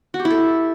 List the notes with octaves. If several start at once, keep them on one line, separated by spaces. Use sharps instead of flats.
F#4
G4
E4
A4